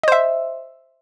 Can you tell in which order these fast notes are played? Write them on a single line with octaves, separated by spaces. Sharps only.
D#5 C5 E5